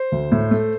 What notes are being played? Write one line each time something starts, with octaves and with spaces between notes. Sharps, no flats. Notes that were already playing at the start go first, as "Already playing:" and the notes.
Already playing: C5
D2
A2
A3